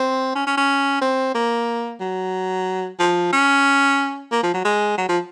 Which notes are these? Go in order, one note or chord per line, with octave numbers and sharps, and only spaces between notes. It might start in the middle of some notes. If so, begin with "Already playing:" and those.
Already playing: C4
C#4
C#4
C#4
C4
A#3
F#3
F3
C#4
A#3
F3
F#3
G#3
F#3
F3